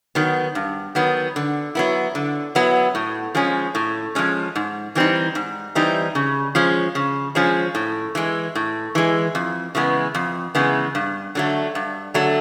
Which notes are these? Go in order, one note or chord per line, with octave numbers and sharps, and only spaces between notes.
D#3 F#3 B3
G2
D#3 F#3 B3
D3
F#3 B3 E4
D3
F#3 B3 E4
A2
F3 G#3 C#4
A2
F3 G#3 C#4
G#2
E3 G3 C4 D#4
G#2
E3 G3 C4 D#4
C#3
F3 G#3 C#4
C#3
F3 G#3 C#4
A2
E3 G#3
A2
E3 G#3
F2
C#3 E3 G#3 B3
F2
C#3 E3 G#3 B3
G2
D3 F#3 A3
G2
D3 F#3 A3